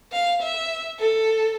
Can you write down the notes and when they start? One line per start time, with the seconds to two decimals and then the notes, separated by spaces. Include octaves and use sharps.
0.13 F5
0.42 E5
1.00 A4